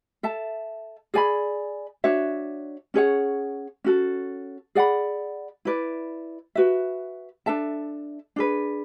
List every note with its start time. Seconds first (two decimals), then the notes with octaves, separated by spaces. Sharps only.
0.23 A4 E5 A5
1.14 G#4 D5 G#5 B5
2.04 D4 F#4 C#5 E5
2.94 C#4 G#4 C#5 F#5
3.84 C#4 F#4 A4
4.75 G#4 D5 F#5 B5
5.65 E4 B4 D5
6.55 F#4 B4 E5
7.46 D4 A4 E5 A5
8.36 D4 G#4 B4